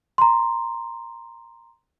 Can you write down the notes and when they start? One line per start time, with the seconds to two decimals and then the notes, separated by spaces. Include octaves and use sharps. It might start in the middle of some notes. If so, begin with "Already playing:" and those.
0.18 A#5 C6